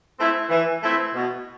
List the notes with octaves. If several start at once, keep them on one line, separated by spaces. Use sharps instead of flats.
A3 C4 E4
E3
A3 C4 E4
B2